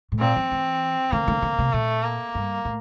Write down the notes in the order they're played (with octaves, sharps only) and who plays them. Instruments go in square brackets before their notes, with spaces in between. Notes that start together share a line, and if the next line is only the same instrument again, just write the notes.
[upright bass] A2
[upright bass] A#2 [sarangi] C4
[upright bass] F3
E3
[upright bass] D3 [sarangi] A#3
[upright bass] D3
D3
C3
[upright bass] A#2 [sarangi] A3
[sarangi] A#3
[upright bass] G2
A2